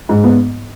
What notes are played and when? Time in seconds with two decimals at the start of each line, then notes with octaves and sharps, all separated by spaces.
0.09 G#2
0.24 B3